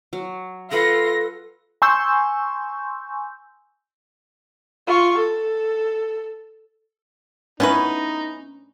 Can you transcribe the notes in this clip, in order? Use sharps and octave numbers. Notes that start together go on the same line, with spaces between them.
F#3
F4 A4 B4 F#5 A#5 A#6
G#5 C6 C#6 E6 G6
F4 C#6
A4
B3 C#4 D#4 E4 B4